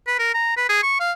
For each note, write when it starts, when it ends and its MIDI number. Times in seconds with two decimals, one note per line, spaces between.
0.07 0.17 71
0.19 0.29 70
0.34 0.54 82
0.57 0.67 71
0.69 0.83 68
0.83 0.98 85
1.00 1.12 77